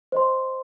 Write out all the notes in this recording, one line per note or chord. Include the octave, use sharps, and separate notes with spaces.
C5 D#5 C6